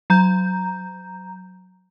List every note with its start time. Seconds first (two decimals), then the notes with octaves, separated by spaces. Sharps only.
0.10 F#3 A#5 G6